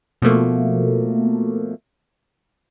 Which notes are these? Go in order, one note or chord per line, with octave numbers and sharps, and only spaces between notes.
B2 F3 A3 A#3